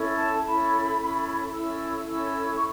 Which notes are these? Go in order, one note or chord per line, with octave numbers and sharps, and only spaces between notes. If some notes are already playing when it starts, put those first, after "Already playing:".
Already playing: C#4 E4 A4 C#5
A5
C#4 E4 A4 C#5 B5
C#4 E4 A4 C#5
C#4 E4 A4 C#5 E6
C#4 E4 A4 C#5 E6
C#6